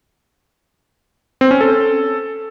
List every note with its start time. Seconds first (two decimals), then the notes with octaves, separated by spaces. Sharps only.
1.41 C4
1.51 C#4
1.61 A4